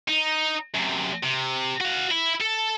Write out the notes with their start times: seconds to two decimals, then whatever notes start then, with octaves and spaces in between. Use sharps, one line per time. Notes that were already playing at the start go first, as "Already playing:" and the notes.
0.08 D#4
0.74 F#2 C3
1.23 C3
1.81 F#4 F5
2.11 E4
2.41 A4